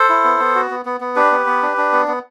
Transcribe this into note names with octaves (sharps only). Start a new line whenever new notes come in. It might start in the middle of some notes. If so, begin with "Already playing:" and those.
Already playing: A4 C5
E4
B3
B3
F#4
B3
B3
B3
D4 G4 B4
B3
B3
D4
D4
B3
B3